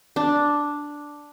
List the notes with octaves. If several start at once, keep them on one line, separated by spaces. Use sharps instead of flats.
D4